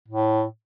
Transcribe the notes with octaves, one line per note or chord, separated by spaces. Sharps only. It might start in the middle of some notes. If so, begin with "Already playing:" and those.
A2